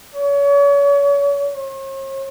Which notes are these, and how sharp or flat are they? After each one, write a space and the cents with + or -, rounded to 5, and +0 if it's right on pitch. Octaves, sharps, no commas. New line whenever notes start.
C#5 +35
C#5 -45